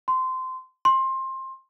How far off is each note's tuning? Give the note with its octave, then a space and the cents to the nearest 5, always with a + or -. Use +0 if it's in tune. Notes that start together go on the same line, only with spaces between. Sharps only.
C6 -20
C6 +20